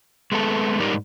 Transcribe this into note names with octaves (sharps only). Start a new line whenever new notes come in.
G#3 A3 B3 G4 A4
G#2 G3 D#4 G4 A#4 D5